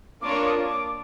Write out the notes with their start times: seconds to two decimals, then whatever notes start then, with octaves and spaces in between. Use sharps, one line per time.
0.22 A#3 D4 F4 A#4 C#5 D6
0.31 C#6
0.38 D6
0.46 D#6
0.70 D6